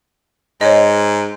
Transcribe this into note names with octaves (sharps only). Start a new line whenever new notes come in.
G#2 C#5 D#5